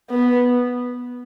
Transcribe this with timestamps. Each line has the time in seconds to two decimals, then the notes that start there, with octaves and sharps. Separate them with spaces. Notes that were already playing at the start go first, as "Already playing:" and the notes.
0.10 B3